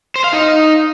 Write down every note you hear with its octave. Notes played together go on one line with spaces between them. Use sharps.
C5
F5
D#4